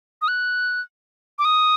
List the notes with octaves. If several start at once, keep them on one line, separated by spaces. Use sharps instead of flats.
D#6
F#6
D6
D#6